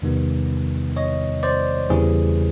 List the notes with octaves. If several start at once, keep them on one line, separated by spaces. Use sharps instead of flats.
E2 C3 D#3 G3 B3
C#5 D#5
C5 D5
E2 C#3 E3 G3 C4 G#4